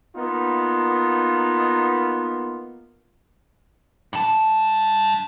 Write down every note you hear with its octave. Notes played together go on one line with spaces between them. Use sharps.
A#3 B3 D#4 F4
G2 A5